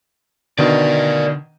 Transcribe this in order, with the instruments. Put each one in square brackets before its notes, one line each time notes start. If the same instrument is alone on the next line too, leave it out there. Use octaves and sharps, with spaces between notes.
[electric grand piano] B2 D#3 [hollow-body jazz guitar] D3 [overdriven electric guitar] A#4 D5